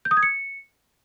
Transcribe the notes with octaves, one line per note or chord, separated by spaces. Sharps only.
G6
D#6
G#6
C#7